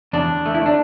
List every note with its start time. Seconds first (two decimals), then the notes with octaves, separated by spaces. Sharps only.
0.13 E2 D4
0.29 E2
0.46 A3
0.54 E4
0.61 A3 D4